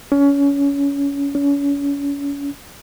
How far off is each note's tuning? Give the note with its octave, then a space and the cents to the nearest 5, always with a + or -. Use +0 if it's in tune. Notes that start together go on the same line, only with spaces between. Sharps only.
C#4 +25
C#4 +35